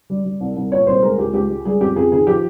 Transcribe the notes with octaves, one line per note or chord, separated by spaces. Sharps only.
G3
G3
C2
C2
A#2 C#5
C2 C5
G#3 A#4
C#2 G4
C#2 G4
G#3
G3 G#4
F2 G4
F2 G#4
D#3 G#4
F3 G4